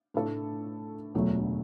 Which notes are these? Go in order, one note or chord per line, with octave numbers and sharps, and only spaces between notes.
A2 A3 D4 A4
E1 D2 D3 F#3 A3